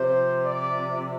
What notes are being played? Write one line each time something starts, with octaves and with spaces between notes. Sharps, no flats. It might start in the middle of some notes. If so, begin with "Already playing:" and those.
Already playing: C3 F3 C5
D5